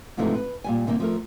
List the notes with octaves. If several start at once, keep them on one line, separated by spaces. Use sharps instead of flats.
G#2 C3 E3 F3 A3 D#4
B4
A#2 G3 G#5
C3 D#3 G3 A#3
F3 A3 A#4